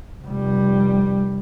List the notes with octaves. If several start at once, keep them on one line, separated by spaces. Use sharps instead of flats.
F1 G3